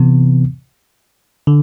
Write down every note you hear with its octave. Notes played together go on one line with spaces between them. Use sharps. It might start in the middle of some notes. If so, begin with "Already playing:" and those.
Already playing: C3 E3 B3
D3